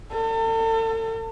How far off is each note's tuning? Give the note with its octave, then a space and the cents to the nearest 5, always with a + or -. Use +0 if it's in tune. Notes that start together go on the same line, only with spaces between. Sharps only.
A4 +40